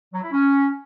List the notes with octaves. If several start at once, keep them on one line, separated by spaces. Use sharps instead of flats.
F#3
E4
C#4